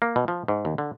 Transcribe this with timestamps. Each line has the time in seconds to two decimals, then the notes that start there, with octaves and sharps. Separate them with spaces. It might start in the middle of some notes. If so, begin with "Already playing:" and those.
0.02 A#3
0.16 B2
0.28 F3
0.48 G#2
0.65 D#2
0.78 D3